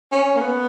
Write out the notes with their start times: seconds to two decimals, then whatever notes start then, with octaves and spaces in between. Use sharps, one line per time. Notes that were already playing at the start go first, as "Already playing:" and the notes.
0.12 C#4
0.35 A#3
0.41 B3